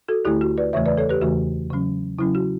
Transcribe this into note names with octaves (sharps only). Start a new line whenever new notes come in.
F#4 A4
D2 D3 A3 E4 G4
F#4
B4 D5
E2 C#3 E3 A3 C#5 E5
B4 D5
A4 C#5
G4 B4
E2 C#3 E3 A3 F#4
C#3 F#3 C#4
C#3 F#3 C#4 E4
F#4